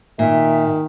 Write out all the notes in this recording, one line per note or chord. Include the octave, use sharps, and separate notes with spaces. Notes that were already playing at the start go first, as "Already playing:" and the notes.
A#2 D#3 E5